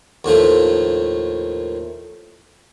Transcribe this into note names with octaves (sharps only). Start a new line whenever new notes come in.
D#2 A2 F3 A3